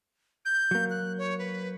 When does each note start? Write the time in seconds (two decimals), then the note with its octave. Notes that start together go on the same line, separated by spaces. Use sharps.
0.45 G6
0.71 F#3 A#3
0.90 F#6
1.18 C#5
1.39 B4